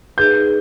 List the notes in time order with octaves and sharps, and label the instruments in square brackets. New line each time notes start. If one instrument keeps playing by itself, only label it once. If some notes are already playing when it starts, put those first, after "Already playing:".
[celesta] D#4 G#4 B4 [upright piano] G6